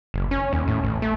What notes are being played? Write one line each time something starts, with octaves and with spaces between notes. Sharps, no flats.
F#1
C#4
D#2
A2
A1
A3